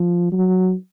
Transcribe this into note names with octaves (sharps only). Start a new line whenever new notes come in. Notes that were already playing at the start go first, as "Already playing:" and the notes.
Already playing: F3
F#3